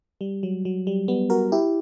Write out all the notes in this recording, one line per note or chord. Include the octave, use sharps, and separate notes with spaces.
G3
F#3
F#3
G3
G3 B3
F#4 A#4
E4 G4